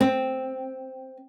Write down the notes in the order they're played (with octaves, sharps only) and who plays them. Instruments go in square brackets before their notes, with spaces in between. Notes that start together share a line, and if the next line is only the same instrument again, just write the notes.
[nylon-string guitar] C4